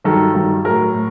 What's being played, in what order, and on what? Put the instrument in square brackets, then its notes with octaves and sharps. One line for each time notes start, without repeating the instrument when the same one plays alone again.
[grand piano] G2 D#3 F#3 A4
G2 D#3 F#3
A2 F#3 A#4
A2